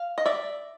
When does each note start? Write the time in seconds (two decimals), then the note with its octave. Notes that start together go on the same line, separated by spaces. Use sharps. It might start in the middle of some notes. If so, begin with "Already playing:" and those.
Already playing: F5
0.18 D#5
0.26 D5 E5